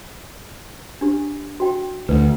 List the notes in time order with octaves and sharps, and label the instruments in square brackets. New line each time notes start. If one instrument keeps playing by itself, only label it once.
[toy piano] D4 G4
F#4 G5
[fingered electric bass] D2 [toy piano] B4